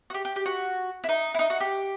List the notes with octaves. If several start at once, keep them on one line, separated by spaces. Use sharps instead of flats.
F#4
G4
G4
G4
F#4
E4
D#4
E4
D#4
F#4
G4